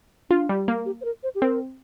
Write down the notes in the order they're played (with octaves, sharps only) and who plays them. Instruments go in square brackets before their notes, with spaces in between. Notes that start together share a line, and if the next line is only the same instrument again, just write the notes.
[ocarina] D4 [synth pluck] F4
[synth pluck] G3
A#3
[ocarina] G4
C5
A#4
C5
G4
[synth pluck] C4 [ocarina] A#4